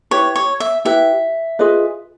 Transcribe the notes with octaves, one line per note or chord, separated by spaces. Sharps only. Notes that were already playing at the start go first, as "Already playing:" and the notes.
E4 G4 B4 C#5
C#5
E5
E4 G4 B4 E5
F4 G#4 B4 D#5